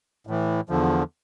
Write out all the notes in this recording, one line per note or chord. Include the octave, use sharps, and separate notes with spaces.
A2 E3
E2 D3 F3